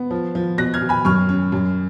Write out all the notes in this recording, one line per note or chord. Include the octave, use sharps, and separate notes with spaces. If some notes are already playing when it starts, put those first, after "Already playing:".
Already playing: B3
F3
F3
B2 F#6 A#6
F6 G#6
B2
G#5 B5
F#2 C#6 F6
C#4
F#2